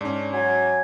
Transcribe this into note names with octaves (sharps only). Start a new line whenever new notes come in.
G#2 C#4 D4
F#3 G#5